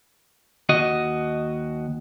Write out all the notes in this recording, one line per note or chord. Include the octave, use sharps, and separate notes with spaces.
D#2 F#4 D#5